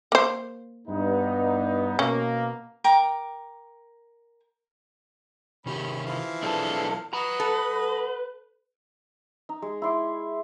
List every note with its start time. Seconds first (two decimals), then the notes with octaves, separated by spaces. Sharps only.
0.12 A#3 C5
0.87 G2 B3 D#4
1.99 B2 A#3 C#4
2.84 A#4 G5 D6
5.66 C3 D#3 C#4 G4 B5
6.06 E3 F3 F5
6.43 B1 D4 G#4 A4 B4
7.13 B4 D#5 F#5 A#5
7.40 A4
9.49 D#4
9.62 G#3
9.82 E4 C6 D6